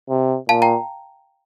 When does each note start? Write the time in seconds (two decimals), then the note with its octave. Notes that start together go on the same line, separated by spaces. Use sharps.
0.09 C3
0.49 A#2 F5 A5
0.62 G5 A#5